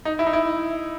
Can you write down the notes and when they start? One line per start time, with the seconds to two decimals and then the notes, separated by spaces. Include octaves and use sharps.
0.05 D#4
0.19 E4
0.27 D#4
0.33 E4